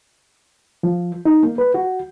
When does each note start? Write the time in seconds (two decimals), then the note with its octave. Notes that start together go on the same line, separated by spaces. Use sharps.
0.83 F3
1.25 D#4
1.43 A#3
1.58 B4
1.74 F#4